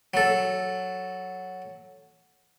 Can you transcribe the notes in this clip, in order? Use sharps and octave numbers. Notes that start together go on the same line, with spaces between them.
F#3 A4